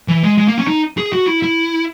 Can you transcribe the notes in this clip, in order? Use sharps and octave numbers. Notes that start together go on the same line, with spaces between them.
E3
G#3
G#3
A#3
C#4
D#4
G#4
F#4
E4
E4